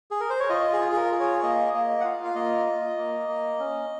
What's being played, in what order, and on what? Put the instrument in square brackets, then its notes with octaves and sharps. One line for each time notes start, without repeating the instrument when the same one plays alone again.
[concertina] G#4
A#4
C5
C#5
F4 D#5
G#4
F4
G#4
A#4
G#4
C#5
A#3 D#5
A#3 D#5
F#5
F4 F5
F5
A#3 D#5
F4
A#3
A#3
C#4